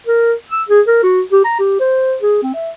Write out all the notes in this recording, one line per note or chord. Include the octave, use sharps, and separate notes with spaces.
A#4
E6
G#4
A#4
F#4
G4
A#5
G4
C5
G#4
C4
E5